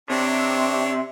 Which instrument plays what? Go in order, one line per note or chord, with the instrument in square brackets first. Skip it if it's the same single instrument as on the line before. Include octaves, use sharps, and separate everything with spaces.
[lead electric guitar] C3 [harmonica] C4 D4 C#5